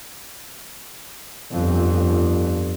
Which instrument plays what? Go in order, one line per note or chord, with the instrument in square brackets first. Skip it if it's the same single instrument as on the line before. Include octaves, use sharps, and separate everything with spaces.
[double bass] G1 F2